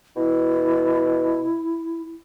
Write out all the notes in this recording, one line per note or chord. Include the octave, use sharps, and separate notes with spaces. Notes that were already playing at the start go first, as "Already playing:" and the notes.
B2 E4